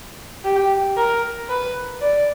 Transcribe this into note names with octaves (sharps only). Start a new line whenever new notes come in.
G4
A#4
B4
D5